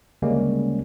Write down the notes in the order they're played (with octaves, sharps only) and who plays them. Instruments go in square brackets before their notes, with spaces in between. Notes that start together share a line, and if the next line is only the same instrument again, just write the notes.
[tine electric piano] D2 C#3 G3 G#3 A#3 C#4